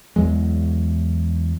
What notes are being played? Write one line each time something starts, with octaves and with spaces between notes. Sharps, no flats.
E2 F#3 G#3